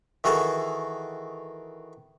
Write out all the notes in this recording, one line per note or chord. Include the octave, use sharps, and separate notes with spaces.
D#3 E3 F#4 G#4 A4